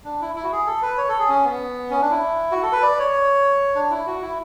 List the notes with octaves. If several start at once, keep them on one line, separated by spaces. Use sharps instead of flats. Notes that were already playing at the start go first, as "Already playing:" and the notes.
D4
E4
E4
F#4
G#4
A4
B4
C#5
A4
G#4
C#4
B3
C#4
D4
E4
F#4
A4
B4
D5
C#5
D4
E4
F#4
E4